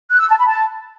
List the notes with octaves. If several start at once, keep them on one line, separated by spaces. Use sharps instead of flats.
F#6
E6
A5
B5
A5